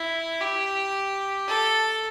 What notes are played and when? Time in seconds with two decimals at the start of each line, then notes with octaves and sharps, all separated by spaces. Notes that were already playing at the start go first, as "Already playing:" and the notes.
Already playing: E4
0.41 G4
1.48 A4